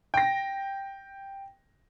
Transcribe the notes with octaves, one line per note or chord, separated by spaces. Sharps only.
G5 A#6